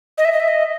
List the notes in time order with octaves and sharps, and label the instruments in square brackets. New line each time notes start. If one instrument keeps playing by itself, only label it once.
[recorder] D#5
E5
D#5
E5
D#5